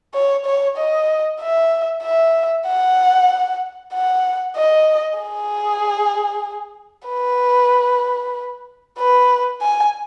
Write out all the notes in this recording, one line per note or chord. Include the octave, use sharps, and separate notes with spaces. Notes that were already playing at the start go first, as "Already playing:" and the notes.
C#5
C#5
D#5
E5
E5
F#5
F#5
D#5
G#4
B4
B4
G#5